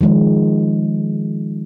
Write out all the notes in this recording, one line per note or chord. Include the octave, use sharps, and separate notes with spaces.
D#3 F3 G#3